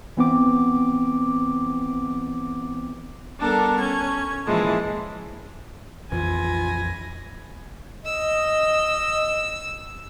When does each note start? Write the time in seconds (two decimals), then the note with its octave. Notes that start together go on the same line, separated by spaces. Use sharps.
0.17 E3 B3 C4 D6
3.38 G3 B3 D4 A4 A#4
3.79 C#4 G#6
4.46 A#2 E3 F3 G#3 E4 A5
6.12 A#1 F2 E3 F4 G#5 B5 A#6
8.05 D#5 E6